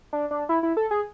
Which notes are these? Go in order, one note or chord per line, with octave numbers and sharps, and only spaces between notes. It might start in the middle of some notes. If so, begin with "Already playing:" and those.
D4
D4
E4
E4
A4
G#4